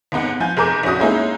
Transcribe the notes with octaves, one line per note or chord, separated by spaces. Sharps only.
D#2 G#2 B3 D#4 F#5
F3 G#5 G6
F1 G#4 A#4 D6 G6
A#1 C#4 F#4 D#6
G#3 A#3 C#4 D#4 E4 G#4